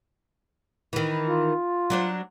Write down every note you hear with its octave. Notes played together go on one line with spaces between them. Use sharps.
D#3 E3
F4
F#3 D4 C5